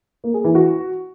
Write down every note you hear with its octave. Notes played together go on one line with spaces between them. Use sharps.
A#3
G#4
E3
F#4